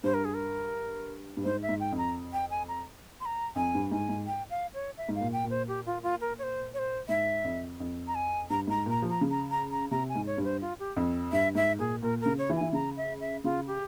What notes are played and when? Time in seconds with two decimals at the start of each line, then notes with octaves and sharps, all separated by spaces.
0.04 G2 C5
0.14 A#4
0.25 G#4
0.34 A#4
1.37 G2
1.44 G#2 C5
1.62 E5
1.69 G#2
1.80 G5
1.92 F2
1.98 A#5
2.33 G5
2.50 G#5
2.68 A#5
3.21 C6
3.25 A#5
3.56 F2 G#5
3.75 G2
3.91 G#2 G#5
4.09 G#2
4.27 G5
4.50 F5
4.74 C#5
4.97 E5
5.09 G#2
5.15 F5
5.21 A#2
5.33 G5
5.44 A#2
5.50 C5
5.68 G4
5.86 F4
6.03 F4
6.21 A#4
6.38 C#5
6.43 C5
6.74 C#5
6.78 C5
7.09 G#2 E5
7.44 F2
7.80 F2
8.07 A#5
8.15 G#5
8.50 G2 A#5
8.67 G#2 A#5
8.86 A#2 A#5
9.02 F3
9.10 A#5
9.21 C#3
9.31 A#5
9.51 A#5
9.71 A#5
9.91 C3 A#5
10.09 G#5
10.15 G#2
10.26 C#5
10.38 G2
10.44 C5
10.61 F4
10.79 G4
10.96 F2
11.32 G2 E5
11.55 G#2 E5
11.79 A#2 G#4
12.02 A#2 A#4
12.21 C#3 A#4
12.38 C#5
12.50 E3
12.56 G#5
12.61 E3
12.73 C#3 A#5
12.97 E5
13.20 E5
13.44 C#3 F4
13.67 G4